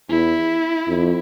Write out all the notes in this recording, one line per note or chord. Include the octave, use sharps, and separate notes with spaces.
E2 E4
F2